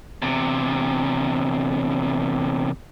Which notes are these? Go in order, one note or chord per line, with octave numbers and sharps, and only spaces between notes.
E2 C3